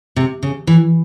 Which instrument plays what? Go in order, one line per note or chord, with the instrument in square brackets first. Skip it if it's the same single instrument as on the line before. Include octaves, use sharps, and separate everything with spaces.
[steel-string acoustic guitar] C3
C#3
E3